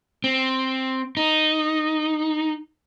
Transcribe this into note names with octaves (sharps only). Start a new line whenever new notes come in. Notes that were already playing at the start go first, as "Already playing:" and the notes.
C4
D#4